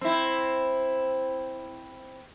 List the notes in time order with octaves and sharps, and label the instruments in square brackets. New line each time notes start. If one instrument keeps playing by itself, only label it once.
[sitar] C4 E4